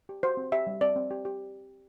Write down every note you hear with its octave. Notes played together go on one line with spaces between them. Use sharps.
G4
F#4 C5
C4
G4 E5
G3
C4 D5
C4
G4
G4